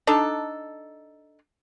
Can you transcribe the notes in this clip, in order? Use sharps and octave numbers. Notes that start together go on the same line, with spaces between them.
D4 D#4 A4